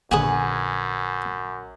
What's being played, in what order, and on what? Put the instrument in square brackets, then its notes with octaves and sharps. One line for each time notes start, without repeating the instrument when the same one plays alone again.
[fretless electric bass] A#1 D3 [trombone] F#2 [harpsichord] F#4 G#4 [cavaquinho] B4 F#5 G#5